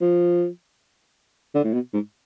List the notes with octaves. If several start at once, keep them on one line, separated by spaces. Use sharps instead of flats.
F3
D3
A2
B2
G#2